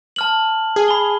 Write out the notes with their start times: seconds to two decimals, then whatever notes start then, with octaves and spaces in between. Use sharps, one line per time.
0.16 A5 F6 F#7
0.76 G#4
0.88 B5 G7